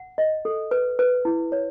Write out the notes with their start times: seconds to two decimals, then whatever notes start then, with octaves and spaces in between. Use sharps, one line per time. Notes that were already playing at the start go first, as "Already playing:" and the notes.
Already playing: F#5
0.18 D#5
0.45 A4
0.71 B4
0.99 B4
1.25 E4
1.52 C#5